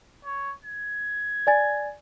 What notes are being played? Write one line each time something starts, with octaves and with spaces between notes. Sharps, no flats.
C#5
G#6
D5 G#5 A6